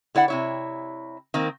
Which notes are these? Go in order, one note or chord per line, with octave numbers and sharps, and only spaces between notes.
D3 E4 D5 F#5
C3 E4 C#5
D#3 A#3 C4